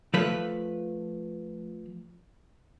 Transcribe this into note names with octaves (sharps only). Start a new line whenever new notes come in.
F3 A3 B4